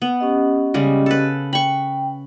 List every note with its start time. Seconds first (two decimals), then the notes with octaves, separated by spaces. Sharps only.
0.02 B3
0.21 C#4 G4 D#5
0.74 C#3 G3 G#3
1.06 A4 B4
1.53 G5 B5 C#6